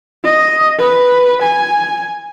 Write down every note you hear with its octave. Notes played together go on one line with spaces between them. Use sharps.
D#5
B4
G#5